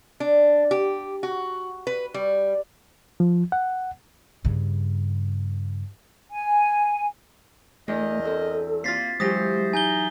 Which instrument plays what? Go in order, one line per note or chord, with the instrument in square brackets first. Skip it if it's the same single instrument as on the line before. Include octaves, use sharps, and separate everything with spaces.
[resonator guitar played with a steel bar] D4
G4
F#4
B4
G3
[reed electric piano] F3
F#5
[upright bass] G2 C#3
[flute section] G#5
[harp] E2 D4 [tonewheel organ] A3 [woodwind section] A#4 D#5
[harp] C4 F#4 [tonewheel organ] A4
[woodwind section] A#3 [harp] C4 F4 [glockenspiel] A6 B6 C7
[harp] E3 F#3 G4 [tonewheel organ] G#3 [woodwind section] C5 [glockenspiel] D#6 A#6
[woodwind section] D#4 [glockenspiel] G#5 G6 G7